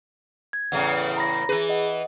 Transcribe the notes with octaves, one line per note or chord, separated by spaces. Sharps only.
G#6
E2 A2 C#3 F#5
A#5 B5 A#6
E3 G#4 B4
D#5 F#5